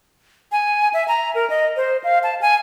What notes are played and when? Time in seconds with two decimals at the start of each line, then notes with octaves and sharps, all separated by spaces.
0.52 G#5
0.94 E5
1.08 A#5
1.35 A#4
1.50 D#5
1.77 C5
2.04 F5
2.23 A5
2.41 G#5